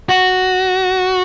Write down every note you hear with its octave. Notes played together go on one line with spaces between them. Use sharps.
F#4